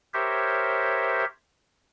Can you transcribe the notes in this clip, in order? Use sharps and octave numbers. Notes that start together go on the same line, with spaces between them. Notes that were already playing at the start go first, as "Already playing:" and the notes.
G4 A#4 C5 C#5 E5